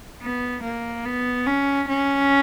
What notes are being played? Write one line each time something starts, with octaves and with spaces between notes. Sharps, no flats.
B3
A#3
B3
C#4
C#4